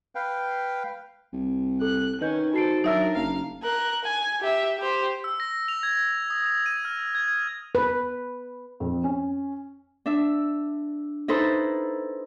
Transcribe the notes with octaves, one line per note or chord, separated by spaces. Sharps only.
B4 F5 G5
C2
A4 F#6
D#3 C#4 B4 D#5 G6
F#4 A4 C5 C7 D7
F#3 D4 D#4 A#4 E5 E6
F#1 F5 A#5
A#4 F#6
G#5
G4 E5
G4 C5
E6
A#6
F7
G#6
D#6
F7
D#7
F6
G#6
B4
F2
C#4
D4 E5
D#4 E4 A4 B4 C5